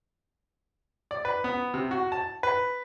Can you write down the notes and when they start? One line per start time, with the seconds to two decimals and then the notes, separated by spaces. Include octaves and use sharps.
1.11 D5
1.25 B4
1.44 B3
1.74 C3
1.91 F#4
2.12 A5
2.43 B4